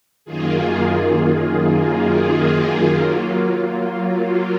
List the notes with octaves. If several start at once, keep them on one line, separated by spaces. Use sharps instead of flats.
F#2 D#3 A#3 F4 G#4
F#3 A#3 F4